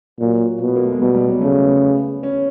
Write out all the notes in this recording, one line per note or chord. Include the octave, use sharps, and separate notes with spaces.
A#2 F#3
B2
B3
A#3
A3
G#3
B2 G3
G3
F#3
C#3 A3
B3
C#4